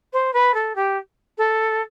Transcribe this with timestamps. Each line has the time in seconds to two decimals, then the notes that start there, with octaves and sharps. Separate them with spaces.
0.13 C5
0.33 B4
0.54 A4
0.75 G4
1.38 A4